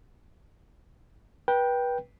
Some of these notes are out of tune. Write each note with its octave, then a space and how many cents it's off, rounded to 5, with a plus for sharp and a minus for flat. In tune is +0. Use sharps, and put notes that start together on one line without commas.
B4 -30 G5 +0